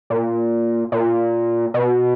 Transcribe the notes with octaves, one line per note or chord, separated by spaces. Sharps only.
A#2
A#2
B2